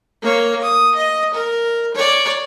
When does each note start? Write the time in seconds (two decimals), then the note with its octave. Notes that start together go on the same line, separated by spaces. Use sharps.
0.22 A#3 C#5
0.62 D#6
0.95 D#5
1.34 A#4
1.94 C#5 D5